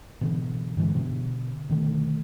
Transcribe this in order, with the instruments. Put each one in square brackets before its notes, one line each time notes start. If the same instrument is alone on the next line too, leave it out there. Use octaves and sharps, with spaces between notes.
[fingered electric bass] B2 D3 E3
G2 D3 E3 G#3
B2 D3
B2 D3 D#3 A3